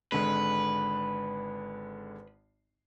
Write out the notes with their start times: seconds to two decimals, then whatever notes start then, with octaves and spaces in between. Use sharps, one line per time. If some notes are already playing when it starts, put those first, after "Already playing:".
0.12 G#1 D3 G#3 B4